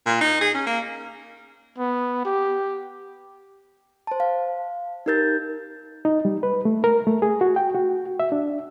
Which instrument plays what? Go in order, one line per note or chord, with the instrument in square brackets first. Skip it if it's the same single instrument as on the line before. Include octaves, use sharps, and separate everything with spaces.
[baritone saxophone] A#2
D#4
G#4
C#4
A#3
[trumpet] B3
G4
[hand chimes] C5 A5
F5
D#4 G4 A#4 G6 A6
[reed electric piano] D#4
G3
B4
A3
A#4
A3
G#4
F#4
G5
F#4
E5
D4